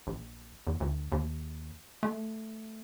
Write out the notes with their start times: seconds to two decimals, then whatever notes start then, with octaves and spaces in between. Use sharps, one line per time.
0.07 A#1
0.67 E2
0.80 D2
1.12 D#2
2.03 A3